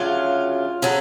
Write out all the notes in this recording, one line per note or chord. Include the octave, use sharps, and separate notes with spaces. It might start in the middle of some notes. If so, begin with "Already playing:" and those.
Already playing: D2 C#3 F#3 F4
C#3 F#3 A4